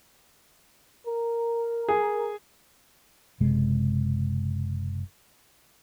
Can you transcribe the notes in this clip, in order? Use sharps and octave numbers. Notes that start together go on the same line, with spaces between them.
A#4
G#4
F#1 C3 G#3